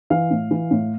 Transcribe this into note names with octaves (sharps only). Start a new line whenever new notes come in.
E3 F5
A2
E3
A2